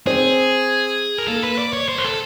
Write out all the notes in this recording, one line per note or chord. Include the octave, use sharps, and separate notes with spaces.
C4 G#4
A#4
A#3 A4
B4
D5
C#5
C5
A#4
A4